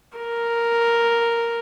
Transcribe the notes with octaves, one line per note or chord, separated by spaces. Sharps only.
A#4